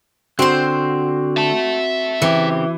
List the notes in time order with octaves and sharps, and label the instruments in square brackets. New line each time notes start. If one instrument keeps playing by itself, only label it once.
[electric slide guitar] D3 [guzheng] C4 C5 [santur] F#4
[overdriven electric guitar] E5 A5
[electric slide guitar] C#3 C4 G4 [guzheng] E3